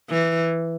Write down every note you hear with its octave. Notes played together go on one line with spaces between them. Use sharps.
E3